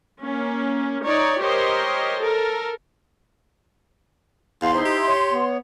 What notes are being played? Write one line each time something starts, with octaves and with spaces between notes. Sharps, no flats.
A#3 C#4
D#4 C#5 D5
G4 A#4 C5 C#5 D#5
A4 A#4
E2 F5 C6
D#4 E4 C5 E5
G4
C#5
B3